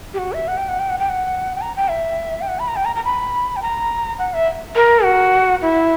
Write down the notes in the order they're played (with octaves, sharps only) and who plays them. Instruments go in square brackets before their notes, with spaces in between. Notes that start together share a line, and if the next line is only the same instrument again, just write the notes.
[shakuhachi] G4
F#4
E5
F#5
G5
F#5
G5
F#5
G5
F#5
G5
A#5
G5
E5
G5
F#5
B5
A#5
G5
A#5
A#5
B5
G5
A#5
F#5
E5
A#4
F#4
E4